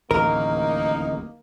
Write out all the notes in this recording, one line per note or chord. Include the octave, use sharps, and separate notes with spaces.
D1 A1 D#2 A#3 D#4 A#4